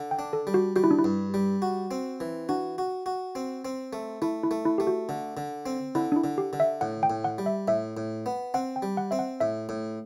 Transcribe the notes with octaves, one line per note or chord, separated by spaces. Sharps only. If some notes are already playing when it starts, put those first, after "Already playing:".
Already playing: D3
G5
D4
A4
G3
F#4
G3 F#4
E4
D4
E4
G2
G3
F#4
C4
E3
D4 F#4
F#4
F#4
C4
C4
A3
A3 E4
E4
A3
E4
A3 G4
F#4
D3
D3
C4
D3 E4
D4
E4
D3
G4
D3
E5
A2 F#5
G5
A2
F#5
G3
E5
A2 E5
A2
B3
C4 F#5
G5
G3
F#5
C4 E5
F#5
A2 E5
A2